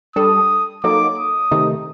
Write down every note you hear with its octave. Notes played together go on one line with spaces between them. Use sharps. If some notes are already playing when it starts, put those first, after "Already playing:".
G3 D4 A4 D#6
F#3 A#3 D#4 A4 D6
D#6
C3 D#3 A3 D#4